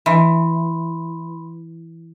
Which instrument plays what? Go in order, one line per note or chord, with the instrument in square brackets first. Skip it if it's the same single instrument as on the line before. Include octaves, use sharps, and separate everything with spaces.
[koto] E3 [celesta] B5 C6